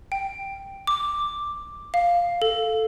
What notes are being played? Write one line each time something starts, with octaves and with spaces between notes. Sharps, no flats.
G5
D6
F5
A4